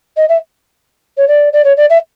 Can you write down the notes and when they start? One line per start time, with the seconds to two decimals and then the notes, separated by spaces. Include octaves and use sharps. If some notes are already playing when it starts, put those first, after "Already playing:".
0.16 D#5
0.28 E5
1.17 C#5
1.27 D5
1.53 D5
1.64 C#5
1.77 D5
1.89 E5